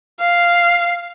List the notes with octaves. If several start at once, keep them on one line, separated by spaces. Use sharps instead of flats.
F5